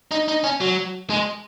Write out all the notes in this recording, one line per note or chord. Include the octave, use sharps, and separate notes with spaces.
D#4
D#4
C#4
F#3
G#3